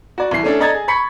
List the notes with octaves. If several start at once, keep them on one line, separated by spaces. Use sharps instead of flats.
F#4 D5
C2 E3 C7
A3 C#4 D4 A4
A4 D5 D#5 A#5 G#6 A6
G#4
B5 C#6 B6 C#7